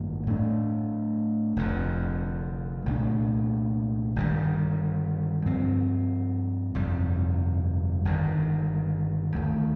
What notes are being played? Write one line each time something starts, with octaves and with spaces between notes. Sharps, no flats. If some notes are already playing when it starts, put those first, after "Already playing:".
Already playing: A1 G2 D#3 A#3
A2 A3 D4
F1 F2 D3
C2 A#2 A3 D4
G1 G2 D#3 G3
G2 F3 C4
G1 F2 C3 G3
G1 G2 D#3
D#2 D#3 A3